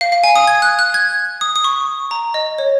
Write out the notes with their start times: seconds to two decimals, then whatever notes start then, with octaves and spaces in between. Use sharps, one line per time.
0.01 F5
0.12 F5
0.24 G#5
0.36 D#6
0.47 G#6
0.62 F#6
0.79 F#6
0.94 G#6
1.41 D#6
1.56 D#6
1.64 C#6
2.11 A#5
2.34 D#5
2.58 C#5